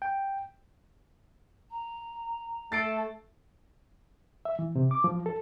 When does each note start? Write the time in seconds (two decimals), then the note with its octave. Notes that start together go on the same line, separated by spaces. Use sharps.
0.02 G5
1.71 A#5
2.72 A3 A4 A6 C7 D7
4.45 E5
4.59 E3
4.76 C3
4.91 D6
5.04 F3
5.26 A4